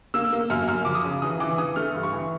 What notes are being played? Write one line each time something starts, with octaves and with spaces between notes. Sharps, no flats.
A#3 E6
A#3
F#2 F6
F#2 F6
F3 D6
D#6
C#3
E3 D#6
E3 D6
E3 D#6
A3 F6
G2
C#6
E3